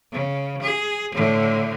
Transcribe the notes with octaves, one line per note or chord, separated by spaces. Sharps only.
C#3
G#4
A2 D3